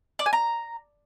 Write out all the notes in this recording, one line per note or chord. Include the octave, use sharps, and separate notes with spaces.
D5
G#5
A#5